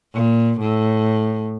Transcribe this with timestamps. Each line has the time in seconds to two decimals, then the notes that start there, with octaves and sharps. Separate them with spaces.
0.14 A#2
0.59 A2